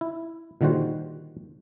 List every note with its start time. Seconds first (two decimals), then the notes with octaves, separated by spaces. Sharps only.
0.01 E4
0.61 A#2 D3 D#3 G3 F#4 C5